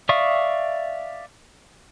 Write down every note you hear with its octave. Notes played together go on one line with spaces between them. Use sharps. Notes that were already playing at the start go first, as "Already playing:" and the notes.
D5 E5 F5 C#6 D#6